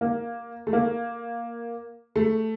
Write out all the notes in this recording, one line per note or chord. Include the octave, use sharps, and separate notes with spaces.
A#3
A3
A#3
A3